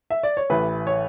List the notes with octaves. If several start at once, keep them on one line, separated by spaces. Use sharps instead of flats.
E5
D5
C#5
A1 A2 E3 B4
C#5